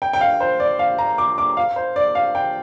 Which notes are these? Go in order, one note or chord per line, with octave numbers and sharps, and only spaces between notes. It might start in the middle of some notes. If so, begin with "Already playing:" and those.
G5
G5
F5
C5
D5
F5
A#5
D6
D6
F5
C5
D5
F5
G5